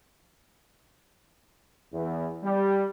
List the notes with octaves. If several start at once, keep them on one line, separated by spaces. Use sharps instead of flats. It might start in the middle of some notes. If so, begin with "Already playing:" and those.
E2
G3